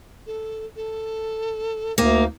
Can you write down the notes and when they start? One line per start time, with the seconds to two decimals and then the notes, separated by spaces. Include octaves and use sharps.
0.27 A4
0.76 A4
1.98 D2 A#3 D#4 F5